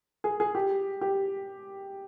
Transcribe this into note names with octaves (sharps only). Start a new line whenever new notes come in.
G#4
G#4
G4
G4